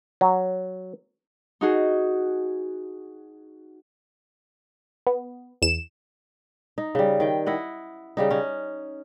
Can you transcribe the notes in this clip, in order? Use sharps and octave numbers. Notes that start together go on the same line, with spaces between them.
F#3
D#4 F#4 G#4
B3
E2 E7
D#4
C#3 G3
D#3 G5
E4 D#5 F#5
C#3 G3 D#4
C#4 D#4